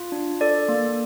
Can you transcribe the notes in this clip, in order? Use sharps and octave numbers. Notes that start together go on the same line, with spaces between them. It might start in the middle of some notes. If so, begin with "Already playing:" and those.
Already playing: F4
D4
A4 D5
A#3